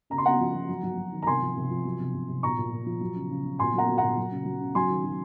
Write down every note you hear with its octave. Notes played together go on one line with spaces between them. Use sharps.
C#3 A#5
C6
C#3 F#5 A#5
F3
F3
F#3
F#3
F#3
D#3
A#5
C3 G#5 C6
F3
C3
F3
F#3
C3
C3
C3
A#2 A#5 C#6
A#2
A#2
F3
F#3
C#3
C#3
C#3
A#2 G#5 C6
F#3 F#5 A#5
F#3
A#2 F#5 A#5
F#3
C#3
F#3
C#3
F#3 G#5 C6
D#3
F#3